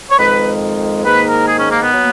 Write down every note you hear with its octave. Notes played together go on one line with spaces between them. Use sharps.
C#5
F2 D#3 G#3 B4
G#2 D#3 A#3 B4
A#4
G#4
C#4
A#3
B3
F#3 A#3